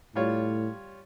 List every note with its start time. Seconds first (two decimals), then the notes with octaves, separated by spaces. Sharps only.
0.15 A2 G3 F4 C#5